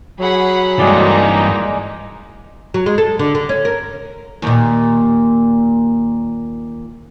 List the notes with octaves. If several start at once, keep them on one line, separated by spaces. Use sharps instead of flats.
F#3 G#4 F#5 B5
G2 E3 G#3 A#3 D#4 D5
F#3
G#3
A4
D3
D3
C#4
A#4
D#2 A#2